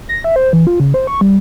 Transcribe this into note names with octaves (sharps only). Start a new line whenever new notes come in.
A#6
E5
C5
E3
F4
C#3
C5
C#6
G3